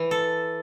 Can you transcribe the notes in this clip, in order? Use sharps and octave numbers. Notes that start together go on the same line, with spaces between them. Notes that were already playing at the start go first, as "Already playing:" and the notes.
Already playing: E3
A4